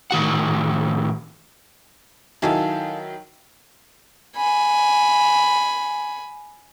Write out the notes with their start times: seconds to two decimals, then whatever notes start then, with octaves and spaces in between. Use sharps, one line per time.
0.11 A2 D#3 F#4 F#5
2.42 D#3 F#3 E4 G#4 A4 F5
4.37 G#5 B5